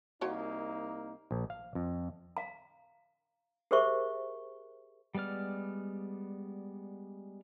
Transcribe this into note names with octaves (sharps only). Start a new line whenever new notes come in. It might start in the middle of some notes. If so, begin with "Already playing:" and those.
C2 F3 A#3 D#4 F#4 C#5
A#1
F5
F2
F5 A#5
G4 G#4 A#4 C5 E5 C#6
G3 G#3 B3 D5 F6